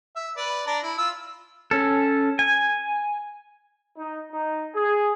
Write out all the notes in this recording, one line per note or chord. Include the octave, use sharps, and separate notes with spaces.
E5
B4 D5
D4 D5 A#5
E4
F4 E6
C#4 A4
G#5
D#4
D#4
G#4